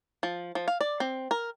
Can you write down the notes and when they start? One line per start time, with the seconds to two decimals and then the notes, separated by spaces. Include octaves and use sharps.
0.23 F3
0.55 F3
0.68 F5
0.81 D5
1.00 C4
1.31 A#4